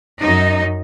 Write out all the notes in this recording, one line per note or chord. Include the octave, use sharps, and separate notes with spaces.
F#2 D#4